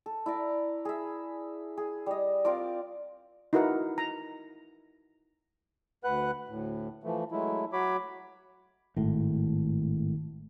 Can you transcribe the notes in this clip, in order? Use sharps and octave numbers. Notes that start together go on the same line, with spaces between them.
A4
E4 D5 A#5
G#4 E5
G#4
G3 D#5
C4 F4 A#4 D5
D#4 E4 F#4 A#4 B4 F#5
A#5
D2 B4 F#5 F#6
D2 A2
E3 F3 A3
F#3 G#3 A3 E4
F#3 F#4 C#5 B5 D6
G#1 A2